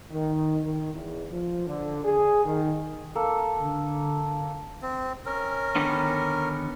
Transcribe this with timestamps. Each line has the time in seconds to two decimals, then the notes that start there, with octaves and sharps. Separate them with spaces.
0.11 D#3
0.64 D#3
0.94 E2
1.32 F3
1.67 D3
2.05 G#4
2.45 D#3
3.15 A#3 A4
3.60 D3
4.82 C4
5.26 C#4 A#4
5.75 D3 D#3 B3